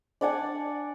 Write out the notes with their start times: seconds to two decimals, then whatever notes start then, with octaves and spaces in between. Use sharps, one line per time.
0.21 D4 D5 F#5 G#5